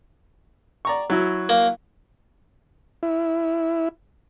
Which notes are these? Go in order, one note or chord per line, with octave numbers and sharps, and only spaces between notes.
D5 A#5 C#6
F#3 E4 F#4
A#3
E4